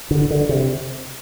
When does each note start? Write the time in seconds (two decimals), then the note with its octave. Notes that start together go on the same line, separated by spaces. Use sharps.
0.11 D3
0.31 D3
0.49 C3